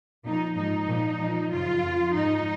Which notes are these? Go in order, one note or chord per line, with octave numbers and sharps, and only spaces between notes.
A#2 F3 D#4
G#2 F3 D#4
A#2 F3
A#2 F3
F#2 C#3 F3 F4
F2 F3
G#2 F3 D#4